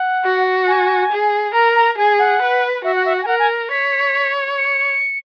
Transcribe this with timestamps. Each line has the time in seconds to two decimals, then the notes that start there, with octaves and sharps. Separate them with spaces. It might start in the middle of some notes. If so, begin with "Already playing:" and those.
Already playing: F#5
0.24 F#4
0.67 G#5
1.11 G#4
1.54 A#4 A#5
1.75 A#5
1.98 G#4 G#5
2.19 F#5
2.42 B4
2.84 F#4 E5
2.95 F#5
3.06 E5
3.17 F#5
3.23 G#5
3.28 A#4 F#5
3.39 G#5
3.71 C#5 B6
4.58 C#7